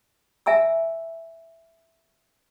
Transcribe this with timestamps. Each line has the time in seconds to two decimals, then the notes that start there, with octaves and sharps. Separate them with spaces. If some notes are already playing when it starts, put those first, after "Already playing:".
0.46 E5 G#5 A#5 E6